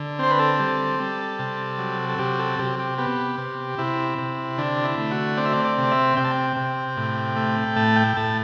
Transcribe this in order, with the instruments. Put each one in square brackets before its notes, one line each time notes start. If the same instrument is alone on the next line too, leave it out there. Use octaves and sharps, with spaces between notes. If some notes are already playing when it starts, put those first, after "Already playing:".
Already playing: [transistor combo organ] D3
C4 C5
B4
A4
G3
G3
C3
F#3
A4
C3 G4
A4
C3 G4
G4
B3 G4
C3
C3 E4
C3
D3 D4
E4
A3
F#4
C4 D5
E5
D5
D5
C3
E5
C3 G5
A5
G5
C3
A2
A3
A2 A5
G5
A2 A5